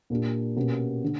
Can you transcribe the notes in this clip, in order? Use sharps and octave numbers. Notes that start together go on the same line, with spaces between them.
A#2 A#3 D4 G4
B2 A#3 C#4 G4
D3